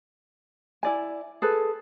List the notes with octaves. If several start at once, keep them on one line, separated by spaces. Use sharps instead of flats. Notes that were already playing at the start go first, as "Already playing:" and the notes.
E4 D5 G#5
G#4 A4 B4